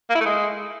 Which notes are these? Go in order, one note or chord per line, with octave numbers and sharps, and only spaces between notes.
A#3
E4
A3
G#3